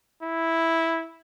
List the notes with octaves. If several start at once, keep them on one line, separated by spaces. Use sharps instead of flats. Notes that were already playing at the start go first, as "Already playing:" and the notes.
E4